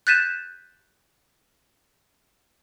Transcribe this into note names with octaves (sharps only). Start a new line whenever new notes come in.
F#6 G6 A6 B6 D#7 E7